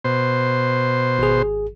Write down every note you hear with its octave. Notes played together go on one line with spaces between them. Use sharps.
B2 C5
G#1 G#4